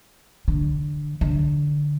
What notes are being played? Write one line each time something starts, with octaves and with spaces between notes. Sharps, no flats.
D3
D3